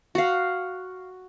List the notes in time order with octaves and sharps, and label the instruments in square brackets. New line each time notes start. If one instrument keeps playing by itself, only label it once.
[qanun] F#4 F5